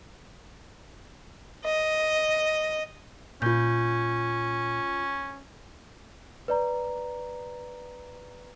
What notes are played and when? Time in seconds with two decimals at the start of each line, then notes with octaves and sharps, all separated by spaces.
1.64 D#5
3.42 A#2 C#4 F4 G6
6.48 B4 D5 A#5